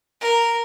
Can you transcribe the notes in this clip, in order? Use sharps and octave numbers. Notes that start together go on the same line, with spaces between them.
A#4